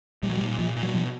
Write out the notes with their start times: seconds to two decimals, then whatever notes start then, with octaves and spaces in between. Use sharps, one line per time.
0.23 A#2 G3
0.30 F#3
0.37 G3
0.41 A#2
0.59 A#2 F3
0.76 A#2
0.83 F#3
0.94 B2 F3